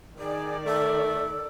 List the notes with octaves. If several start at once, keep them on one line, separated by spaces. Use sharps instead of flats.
D#3 G#4 D5
A3 A4